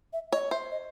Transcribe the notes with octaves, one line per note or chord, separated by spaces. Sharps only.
E5
C#5 D#5
C5 E5
D#5